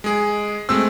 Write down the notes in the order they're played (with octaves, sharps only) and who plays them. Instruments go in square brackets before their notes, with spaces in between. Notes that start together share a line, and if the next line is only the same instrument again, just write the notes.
[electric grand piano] G#3 G#4
[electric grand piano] G#3 A3 C4 [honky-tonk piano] E6